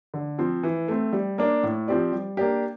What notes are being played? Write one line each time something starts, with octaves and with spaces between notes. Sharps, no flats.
D3
F3 C4
E3
A3 C4
G3
A#3 D4
A2
F3 C4 G4 D5
G3
A#3 D4 G4